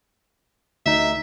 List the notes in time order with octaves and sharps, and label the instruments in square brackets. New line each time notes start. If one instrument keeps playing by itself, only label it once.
[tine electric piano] D2 D#4 [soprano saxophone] E5